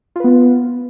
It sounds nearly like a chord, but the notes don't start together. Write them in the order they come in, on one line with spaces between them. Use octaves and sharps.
F4 B4 B3